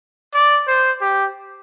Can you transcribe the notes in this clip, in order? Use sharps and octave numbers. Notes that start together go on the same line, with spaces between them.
D5
C5
G4